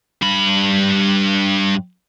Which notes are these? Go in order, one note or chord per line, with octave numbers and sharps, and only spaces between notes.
G2 B5